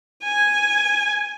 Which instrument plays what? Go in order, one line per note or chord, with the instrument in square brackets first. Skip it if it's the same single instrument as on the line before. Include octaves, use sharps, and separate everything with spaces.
[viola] G#5